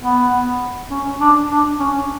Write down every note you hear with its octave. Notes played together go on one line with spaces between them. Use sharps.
B3
C#4
D4
D4
C#4